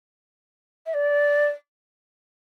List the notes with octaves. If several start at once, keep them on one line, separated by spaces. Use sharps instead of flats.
E5
D5